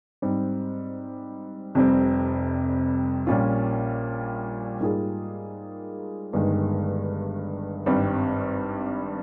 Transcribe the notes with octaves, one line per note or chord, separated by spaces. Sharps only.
G#2 G3 C4
F1 F2 C3 G3 C4
A#1 A#2 G3 C#4 F4
G#2 G3 A#3 F4 G#4
G1 G2 D#3 G#3
G#1 G2 G3 C4